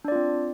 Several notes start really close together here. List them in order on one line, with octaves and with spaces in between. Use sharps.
D4 D5 F4 C4